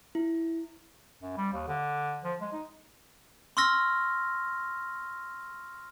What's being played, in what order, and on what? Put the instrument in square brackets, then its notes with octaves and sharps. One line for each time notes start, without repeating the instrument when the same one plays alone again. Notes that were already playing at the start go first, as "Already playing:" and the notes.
[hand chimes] E4
[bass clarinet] F#2
G3
D#2
D3
F3
G#3
D#4
[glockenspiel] C6 C#6 E6 F6 A#6